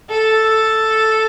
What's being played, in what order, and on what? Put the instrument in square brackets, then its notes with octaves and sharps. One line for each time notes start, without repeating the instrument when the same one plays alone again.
[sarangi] A4